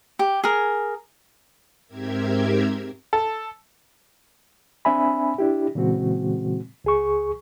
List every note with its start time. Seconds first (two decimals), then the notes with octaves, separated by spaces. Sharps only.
0.19 G4
0.44 G#4 A#4
1.87 G#2 C4 G4 A#4 E5 G#6
3.13 A4
4.85 C4 D4 E5 G#5 B5
5.38 D4 E4 G4
5.75 A#2 C#3 E3 G#3 C4 F#4
6.84 C#2 G#4 C#6